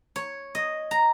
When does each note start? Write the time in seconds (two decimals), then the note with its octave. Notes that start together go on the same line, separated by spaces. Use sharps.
0.16 C#5
0.55 D#5
0.91 A#5